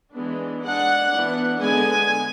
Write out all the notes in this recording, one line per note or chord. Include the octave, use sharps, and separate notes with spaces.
E3 G#3 B3 D4
G#3 D4 F#5
E3 B3 D4
D3 G#3 B3 G#5